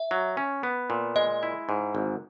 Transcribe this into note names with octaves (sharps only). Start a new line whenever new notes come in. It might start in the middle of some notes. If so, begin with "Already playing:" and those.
Already playing: E5
F#3
C#4
B3
A#2
G#3 D#5
E4
G#2
G#1